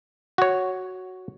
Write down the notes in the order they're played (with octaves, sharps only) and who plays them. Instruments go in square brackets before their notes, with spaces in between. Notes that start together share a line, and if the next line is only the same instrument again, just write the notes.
[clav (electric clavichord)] F#4 C#5